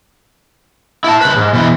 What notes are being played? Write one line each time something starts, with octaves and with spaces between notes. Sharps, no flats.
E4 A5
C#2 B4
G#2
B2 E3